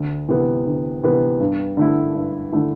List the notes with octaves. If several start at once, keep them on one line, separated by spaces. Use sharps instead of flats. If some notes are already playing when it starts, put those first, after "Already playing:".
Already playing: D2
C3 E3 B3
D2
C3 E3 B3
G2
D3 A3 E4
G2
D3 A3 E4